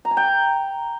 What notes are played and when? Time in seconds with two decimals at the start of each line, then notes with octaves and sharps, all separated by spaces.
0.05 A#5
0.11 G#5
0.17 G5